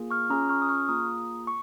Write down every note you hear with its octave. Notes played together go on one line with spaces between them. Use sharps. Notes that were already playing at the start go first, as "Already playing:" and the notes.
Already playing: A#3 F4 G#4
C#6 F6
C#4 F4 G#4 A#5 D#6
C#6 F6
D#6
C#6 F6
A#3 F4 G#4 A#5 D#6
C#6